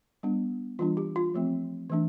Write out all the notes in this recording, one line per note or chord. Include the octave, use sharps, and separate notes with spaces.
G3 B3 D4
E3 G3 D4 F4
G4
F4
F3 A3 C4
E3 A3 D4